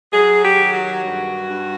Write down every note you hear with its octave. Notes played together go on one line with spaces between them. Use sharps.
F#3 G#4
G4
D#3
F#4
G2
G2